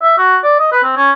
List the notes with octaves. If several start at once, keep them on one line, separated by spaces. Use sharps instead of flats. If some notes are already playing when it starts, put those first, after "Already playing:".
E5
F#4
D5
D#5
B4
C4
C#4